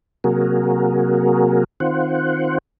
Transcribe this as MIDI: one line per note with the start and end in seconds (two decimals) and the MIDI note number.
0.24 1.64 48
0.24 1.64 54
0.24 1.64 58
0.24 1.64 66
0.24 1.64 68
0.24 1.64 70
1.80 2.58 51
1.80 2.58 60
1.80 2.58 65
1.80 2.58 72
1.80 2.58 78